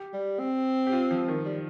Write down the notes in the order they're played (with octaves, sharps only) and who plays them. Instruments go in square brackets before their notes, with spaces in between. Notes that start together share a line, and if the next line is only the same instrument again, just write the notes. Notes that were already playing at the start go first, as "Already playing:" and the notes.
Already playing: [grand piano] G4
[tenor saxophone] G3
C4
[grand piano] G4
F4
F3
D#3
[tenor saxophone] G3